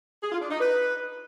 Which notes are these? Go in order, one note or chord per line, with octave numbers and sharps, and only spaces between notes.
G#4
F4
D4
D#4
B4